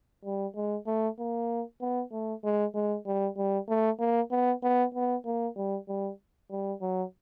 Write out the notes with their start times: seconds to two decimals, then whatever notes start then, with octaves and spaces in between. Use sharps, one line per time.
0.25 G3
0.55 G#3
0.87 A3
1.19 A#3
1.81 B3
2.12 A3
2.44 G#3
2.75 G#3
3.06 G3
3.37 G3
3.69 A3
3.99 A#3
4.31 B3
4.63 B3
4.94 B3
5.26 A#3
5.56 G3
5.88 G3
6.51 G3
6.82 F#3